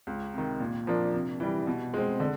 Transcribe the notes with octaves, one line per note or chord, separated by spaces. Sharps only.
C#2
C3 D#3
A#2
F3 A#3 D4
C3
E3 G3
B2
G#3 C4
D3